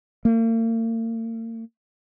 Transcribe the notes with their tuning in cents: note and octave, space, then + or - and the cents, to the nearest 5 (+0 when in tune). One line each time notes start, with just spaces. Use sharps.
A#3 -45